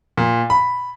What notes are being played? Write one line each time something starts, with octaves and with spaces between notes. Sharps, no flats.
A#2
B5